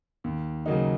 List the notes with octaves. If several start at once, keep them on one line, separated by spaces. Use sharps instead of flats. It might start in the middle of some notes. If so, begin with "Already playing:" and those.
D#2
C#3 F#3 A#3 D#4